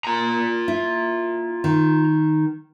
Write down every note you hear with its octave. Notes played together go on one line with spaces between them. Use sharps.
F4 A#5
E4
D#3